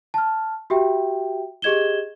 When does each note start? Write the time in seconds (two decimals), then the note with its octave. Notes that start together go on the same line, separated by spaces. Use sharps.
0.14 A5 F6
0.70 F#4 G4 E5 G5
1.62 G4 G#4 D#5 G#6 E7 G7